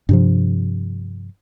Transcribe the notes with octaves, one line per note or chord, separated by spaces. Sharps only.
G2 C3 F3